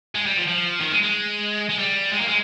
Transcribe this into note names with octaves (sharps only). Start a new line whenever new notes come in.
G#3
G3
F3
F3
D#3
G#3
G#3
G#3
G3
G#3
A#3
G#3